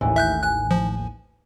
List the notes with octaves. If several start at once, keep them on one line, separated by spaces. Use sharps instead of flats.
A1 D#2 A2 E3
E5 F#6 G6
G#5 F#6
F3